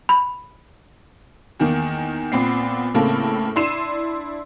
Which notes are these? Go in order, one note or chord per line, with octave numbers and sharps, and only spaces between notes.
B5
E2 D#3 A#3
A#2 B3 C4 C7
A2 C#3 A#3 C4 A4
D4 E4 C6 C7 D#7 E7